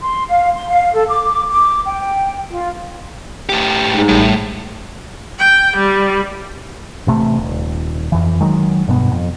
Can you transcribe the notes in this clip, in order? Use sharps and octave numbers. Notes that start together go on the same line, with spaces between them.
C6
F5
C6
F5
A4
D6
D6
G5
F4
A2 G4
G#2
A1 A2 G3
G5
G3
A1 C3 A3
D#1
F2 E3
D#3 F#3 G#3
F1 G2 B2 B3
F2